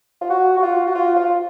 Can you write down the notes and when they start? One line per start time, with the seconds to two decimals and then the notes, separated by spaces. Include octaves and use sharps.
0.21 F4
0.30 F#4
0.57 F#4
0.63 F4
0.87 F#4
0.95 F4
1.16 F4